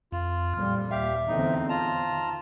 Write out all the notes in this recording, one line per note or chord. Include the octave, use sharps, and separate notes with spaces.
F2 F4
F2 A#2 G3 F6
D#2 G4 E5 F5
E2 A2 D3 C4 D#4
F4 A5 A#5
D#3